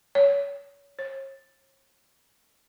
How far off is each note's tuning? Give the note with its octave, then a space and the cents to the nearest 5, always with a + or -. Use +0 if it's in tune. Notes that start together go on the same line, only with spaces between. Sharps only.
C#5 +25
C#5 -40